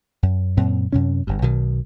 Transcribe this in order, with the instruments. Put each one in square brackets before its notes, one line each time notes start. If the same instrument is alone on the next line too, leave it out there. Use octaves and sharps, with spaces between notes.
[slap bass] F#2
F#2 A#2 C4
F#2 C3 C#4
G1 G2
B1 B2 D#3